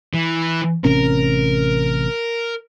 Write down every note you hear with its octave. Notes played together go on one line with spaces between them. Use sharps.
E3
A1 C3 C#4 A#4